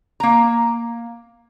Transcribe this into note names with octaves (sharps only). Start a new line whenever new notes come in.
A#3 A#5